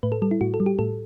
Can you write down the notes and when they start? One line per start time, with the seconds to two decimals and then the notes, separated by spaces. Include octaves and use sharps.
0.03 A2 B4
0.12 A4
0.22 G3 A4
0.31 E4
0.41 A2 F#4
0.54 A4
0.60 G3
0.66 G4
0.79 A2 A4